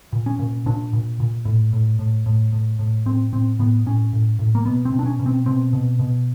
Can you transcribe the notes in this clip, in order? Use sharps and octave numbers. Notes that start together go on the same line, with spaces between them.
A#2
C#4
A#2
A#2 D4
A#2
A#2
A2
A2
A2
A2
A2
A2
A2 C4
A2 C4
A2 B3
A2 C#4
A2
A2
A#3
B2 B3
C4
B2
D4
C#4
B2
C4
B2 C4
B2
B2